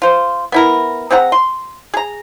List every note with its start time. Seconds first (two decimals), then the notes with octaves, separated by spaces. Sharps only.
0.02 F4 C5
0.52 B3 E4 A#4
1.10 C4 G#4 F#5 A#5
1.32 C6
1.94 G#4 A#5